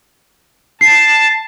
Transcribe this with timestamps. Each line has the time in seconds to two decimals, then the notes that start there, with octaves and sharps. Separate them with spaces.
0.81 A5 C7